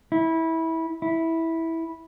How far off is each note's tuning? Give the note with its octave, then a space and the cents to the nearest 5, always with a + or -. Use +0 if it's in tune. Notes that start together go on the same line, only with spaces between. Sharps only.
E4 -20
E4 -10